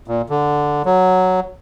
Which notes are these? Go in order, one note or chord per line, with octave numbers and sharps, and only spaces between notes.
A#2
D3
F#3